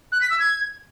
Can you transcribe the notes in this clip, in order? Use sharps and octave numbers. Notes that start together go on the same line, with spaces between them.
F#6
B6
E6
G#6